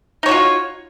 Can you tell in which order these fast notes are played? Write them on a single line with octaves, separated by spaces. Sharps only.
D#4 C#5 F#4 F4